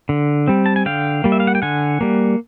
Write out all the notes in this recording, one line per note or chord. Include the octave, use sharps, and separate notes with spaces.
D3
G3 C4
A5
G#5
D3 F5 G5
G3 A#3
E5
F5
F#5
G5
D3 F#5 G#5
G3 A#3